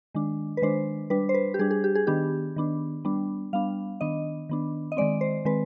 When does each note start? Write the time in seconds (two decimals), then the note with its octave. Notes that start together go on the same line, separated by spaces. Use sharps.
0.15 D#3 G#3 D4
0.57 B4
0.62 D#3 G#3 D4 C5
1.10 G3 D4 B4
1.29 C5
1.34 B4
1.54 G4
1.59 G3 D4 G#4
1.71 G#4
1.84 G4
1.95 G#4
2.07 D#3 B3 D4 G4
2.56 D#3 B3 D4
3.05 G3 B3 D4
3.53 G3 B3 D4 F5
4.01 D#3 B3 D4 D#5
4.49 D#3 B3 D4
4.92 D#5
4.97 D#3 G#3 C4 D5
5.21 C5
5.45 D#3 G#3 C4 B4